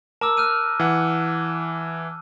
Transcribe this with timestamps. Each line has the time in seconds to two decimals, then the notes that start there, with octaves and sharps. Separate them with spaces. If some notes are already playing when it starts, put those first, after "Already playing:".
0.21 A#4 A5 D6 E6
0.37 F6 F#6 D#7
0.80 E3 F#5